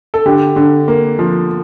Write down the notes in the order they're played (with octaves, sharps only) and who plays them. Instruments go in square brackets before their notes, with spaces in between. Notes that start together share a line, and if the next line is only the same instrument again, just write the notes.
[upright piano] A4
D3 G4
D3
A#3
F3